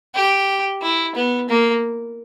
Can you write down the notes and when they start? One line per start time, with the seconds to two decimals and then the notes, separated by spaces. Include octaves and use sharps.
0.15 G4
0.82 E4
1.16 B3
1.49 A#3